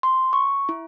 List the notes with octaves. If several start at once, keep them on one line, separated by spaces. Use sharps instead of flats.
C6
C#6
E4